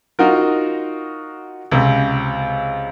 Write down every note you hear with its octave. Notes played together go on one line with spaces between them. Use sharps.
D#4 F4 F#4 A#4
C#2 C3